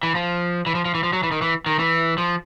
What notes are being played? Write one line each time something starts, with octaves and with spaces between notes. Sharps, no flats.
E3
F3
E3
F3
F3
E3
F3
F#3
E3
D#3
E3
D#3
E3
F3